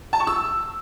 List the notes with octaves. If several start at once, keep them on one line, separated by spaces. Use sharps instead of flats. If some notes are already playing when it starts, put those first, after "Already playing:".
A5
C#6
E6